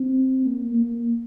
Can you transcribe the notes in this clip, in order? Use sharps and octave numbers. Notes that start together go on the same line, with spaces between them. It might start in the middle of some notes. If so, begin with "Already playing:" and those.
Already playing: C4
A#3
A#3